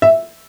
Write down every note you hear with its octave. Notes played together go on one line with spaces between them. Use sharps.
E5